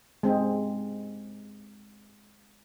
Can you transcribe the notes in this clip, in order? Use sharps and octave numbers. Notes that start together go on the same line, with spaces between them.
G#3 C4